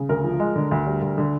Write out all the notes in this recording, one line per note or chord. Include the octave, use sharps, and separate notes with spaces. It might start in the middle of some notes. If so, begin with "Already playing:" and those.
Already playing: C#3
D2 A#4
F3
G#3
D3
D2
G3
D2
D3